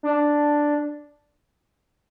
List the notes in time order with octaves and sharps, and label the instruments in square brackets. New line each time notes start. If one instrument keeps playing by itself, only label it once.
[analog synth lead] D4